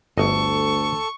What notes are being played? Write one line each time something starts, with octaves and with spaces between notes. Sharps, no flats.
G1 D2 A4 D#5 C#6